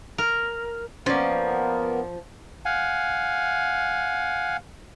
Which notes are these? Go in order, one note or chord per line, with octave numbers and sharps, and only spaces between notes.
A#4
F3 A#3 B3 C#4 A#4 D5
F5 F#5 G#5